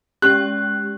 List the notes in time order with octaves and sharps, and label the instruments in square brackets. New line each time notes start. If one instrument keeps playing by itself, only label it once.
[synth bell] G#3 C#4 G4 [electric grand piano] F#6